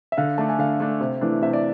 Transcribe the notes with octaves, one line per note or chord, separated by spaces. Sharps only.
E5
D3 F5
A3 D4 A5
G#5
D3 F5
A3 D4
C3
E3 A3 D4
C3 E5
D5